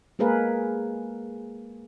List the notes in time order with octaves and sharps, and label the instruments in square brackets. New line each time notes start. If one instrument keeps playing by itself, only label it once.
[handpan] G#3 A#3 G#4 A#4 B4 F5